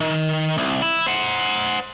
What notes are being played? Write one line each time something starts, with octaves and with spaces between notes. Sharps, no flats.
D#3
C2
E4
C5 F#5